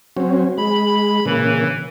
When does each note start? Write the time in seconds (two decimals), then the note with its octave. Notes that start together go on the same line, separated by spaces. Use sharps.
0.17 F#3 C4 C#4
0.58 G#3 B5
1.26 A#2 C#3 E3